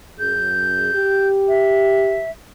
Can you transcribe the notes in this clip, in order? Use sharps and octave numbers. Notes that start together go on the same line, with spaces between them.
F#2 G#4 G6
G4
E5